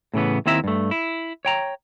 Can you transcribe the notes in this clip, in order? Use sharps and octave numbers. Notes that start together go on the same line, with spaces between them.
A2 C#3 E3 B3
D#2 D#3 C4 E4 E5 A#5
G2 A3
E4
C#5 G5 A#5